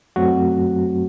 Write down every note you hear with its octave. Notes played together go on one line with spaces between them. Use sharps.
F#2 F#3 A3 C4 F#4